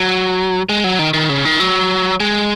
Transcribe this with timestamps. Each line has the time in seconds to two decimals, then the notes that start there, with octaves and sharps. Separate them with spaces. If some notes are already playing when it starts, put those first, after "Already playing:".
Already playing: F#3
0.69 G#3
0.84 F#3
0.99 D#3
1.14 D#3
1.29 C#3
1.45 D#3
1.60 F#3
2.20 G#3